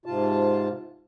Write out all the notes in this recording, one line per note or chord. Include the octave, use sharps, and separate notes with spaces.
G#2 C3 F4 A5